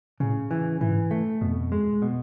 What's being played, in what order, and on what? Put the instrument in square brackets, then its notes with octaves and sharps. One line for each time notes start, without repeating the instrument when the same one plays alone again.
[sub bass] A2 [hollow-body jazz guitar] C#3
[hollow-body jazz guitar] E3
[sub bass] G#2 [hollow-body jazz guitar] E3
[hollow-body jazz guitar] A3
[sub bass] F2 [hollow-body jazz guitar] B2
[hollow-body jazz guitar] G#3
B2